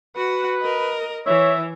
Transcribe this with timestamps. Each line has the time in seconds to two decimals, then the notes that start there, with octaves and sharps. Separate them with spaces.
0.16 F#4 B4 F#5
0.62 A#4 D#5
1.27 E3 C#5 E5